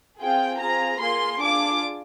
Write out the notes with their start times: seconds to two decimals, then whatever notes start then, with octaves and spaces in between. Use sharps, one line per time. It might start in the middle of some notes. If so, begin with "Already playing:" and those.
0.20 C4 F4 G#4 G5
0.59 C4 F4 G#4 A#5
1.00 A#3 F4 G#4 C6
1.40 D4 F4 G#4 D6